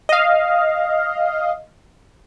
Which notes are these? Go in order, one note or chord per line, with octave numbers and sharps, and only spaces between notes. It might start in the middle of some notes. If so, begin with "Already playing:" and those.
D#5 F5